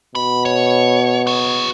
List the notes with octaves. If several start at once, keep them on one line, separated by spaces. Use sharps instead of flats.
B2 B5
C#5
F#4 G#4